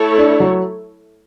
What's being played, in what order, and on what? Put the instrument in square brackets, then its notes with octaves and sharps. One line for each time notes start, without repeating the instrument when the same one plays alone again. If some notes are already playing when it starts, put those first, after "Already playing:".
Already playing: [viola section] A3 E4 A4 C#5
[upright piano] D4
F#3